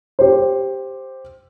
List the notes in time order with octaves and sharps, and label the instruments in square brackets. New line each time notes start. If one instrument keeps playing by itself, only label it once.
[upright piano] G4 C5